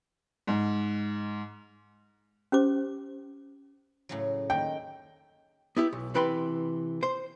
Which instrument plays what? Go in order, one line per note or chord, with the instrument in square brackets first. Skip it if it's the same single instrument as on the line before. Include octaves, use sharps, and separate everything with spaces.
[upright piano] G#2
[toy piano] C#4 G4 C5 D6
[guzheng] A2 C#3 F#3
[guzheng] D#3 [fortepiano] G5
[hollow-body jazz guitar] B3 E4 G4
B1
C3 E3 B4 G5 B5 C6
C5